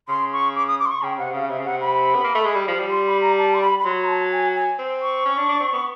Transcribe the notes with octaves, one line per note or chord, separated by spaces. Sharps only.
C#3 C6
C#6
D6
D#6
D6
C6
C#6
C#3 G5
C3 F#5
C#3 F5
C3 E5
C#3
C3 F#5
B5
B3
A#3
A3
G#3
G3
F3
G3
C6
B5
A#5
A5
C6
B5
B5
F#3 C6
A#5
A5
G#5
G#5
C4
C#6
C#4
D4
D4
C4
B3